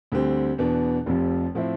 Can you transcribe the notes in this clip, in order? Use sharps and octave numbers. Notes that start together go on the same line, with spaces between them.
D2 D3 G3 C4
E2 B2 B3 D4
F1 F2 C3 F3
A2 F3 C4 E4